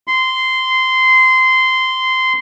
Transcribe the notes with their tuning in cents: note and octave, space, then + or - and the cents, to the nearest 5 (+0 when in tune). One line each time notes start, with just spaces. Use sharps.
C6 -15